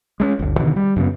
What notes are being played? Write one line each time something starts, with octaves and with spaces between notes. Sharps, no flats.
G#3 A3 C#4
G1 D2
B2 D3 D#3
G3
F#2 C#3 B3